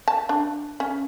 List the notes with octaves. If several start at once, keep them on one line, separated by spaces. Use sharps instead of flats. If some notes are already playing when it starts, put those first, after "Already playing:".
A5
D4
C#4